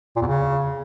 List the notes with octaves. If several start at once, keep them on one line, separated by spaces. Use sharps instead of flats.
A#2
E2
C#3